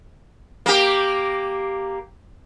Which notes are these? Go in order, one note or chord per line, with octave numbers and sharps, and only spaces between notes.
A#3 G4